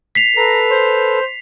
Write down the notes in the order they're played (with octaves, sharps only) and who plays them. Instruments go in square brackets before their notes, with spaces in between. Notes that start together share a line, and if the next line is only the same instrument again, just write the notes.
[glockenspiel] B6 C7 F7
[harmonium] A4 B4 [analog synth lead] A#5
[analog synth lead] C5